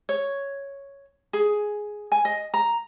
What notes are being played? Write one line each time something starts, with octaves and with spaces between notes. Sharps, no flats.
C#5
G#4
G#5
D#5
A#5